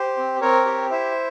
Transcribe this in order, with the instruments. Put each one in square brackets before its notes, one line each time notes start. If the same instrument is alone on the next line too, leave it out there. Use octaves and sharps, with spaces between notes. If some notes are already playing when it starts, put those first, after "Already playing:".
Already playing: [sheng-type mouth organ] G4 C5
C4
C4 A#4 C#5
G4
E4 C5 E5